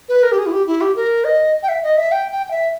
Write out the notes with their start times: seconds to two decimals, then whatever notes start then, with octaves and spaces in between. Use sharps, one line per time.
0.09 B4
0.23 A#4
0.32 G4
0.38 G#4
0.46 E4
0.52 G4
0.67 E4
0.81 G4
0.96 A#4
1.25 D#5
1.63 G5
1.69 E5
1.83 D#5
1.97 E5
2.12 G5
2.32 G5
2.47 G5
2.51 E5